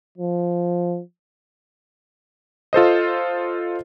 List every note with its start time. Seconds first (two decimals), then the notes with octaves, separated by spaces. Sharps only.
0.18 F3
2.73 F4 A4 C5 D#5